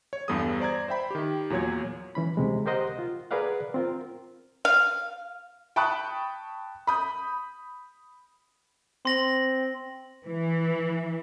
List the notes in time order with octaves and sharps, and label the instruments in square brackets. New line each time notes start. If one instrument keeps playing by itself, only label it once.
[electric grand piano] C#5
E2 G2 B3 A4 D#6
C5 D5 A#5 G#6
C5 E5 G5 B5
D#3 G4
E2 A#2 F#3 C#5 G#6
[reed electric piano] E3 C#4 B5
D2 C3 G#3
G4 A#4 C5 D#5 F#5
F4
G#4 A#4 B4 D5 F5 F#5
C4 F4 A#4
[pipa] F5
[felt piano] G5 A5 B5 C#6 D#6 F#6
B5 D#6 G6
[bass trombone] C4 [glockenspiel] C6 A#6 F#7
[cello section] E3